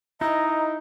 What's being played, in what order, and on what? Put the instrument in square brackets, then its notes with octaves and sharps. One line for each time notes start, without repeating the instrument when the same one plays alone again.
[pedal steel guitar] D#4 [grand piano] E4 [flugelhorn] D#5 [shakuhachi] A#5